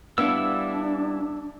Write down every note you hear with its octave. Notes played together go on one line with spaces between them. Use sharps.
G3 B3 D4 E4 C#5 F5 E6